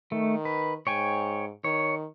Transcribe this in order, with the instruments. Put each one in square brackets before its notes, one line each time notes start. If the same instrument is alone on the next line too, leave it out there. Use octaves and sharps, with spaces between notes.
[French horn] D#3 [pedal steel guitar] A3
[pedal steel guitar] B4
[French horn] G#2 [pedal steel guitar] C#5 G5 G#5
[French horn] D#3 [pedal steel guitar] C#5